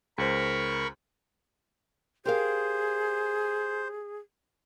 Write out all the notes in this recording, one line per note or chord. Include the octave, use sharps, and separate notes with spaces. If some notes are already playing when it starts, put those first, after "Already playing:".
C#2 A#4 C5 B5 C#6
G4 G#4 A#4 C5 F5